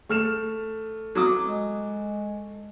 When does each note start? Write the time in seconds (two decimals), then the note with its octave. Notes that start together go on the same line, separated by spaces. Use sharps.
0.09 A3 F6 E7
1.15 F#3 D6 D#6
1.45 G#3